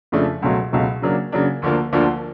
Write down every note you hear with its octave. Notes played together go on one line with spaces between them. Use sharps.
F2 C#3 F3 A3 D4
C#2 B2 F#3 A3
C#2 B2 F#3 A3
C#3 F#3 A#3 D4
C#3 F#3 A#3 D4
D2 D3 F3 A#3
D2 D3 F3 A#3